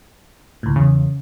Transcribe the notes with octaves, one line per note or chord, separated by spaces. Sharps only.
C#2 A2
E2 C#3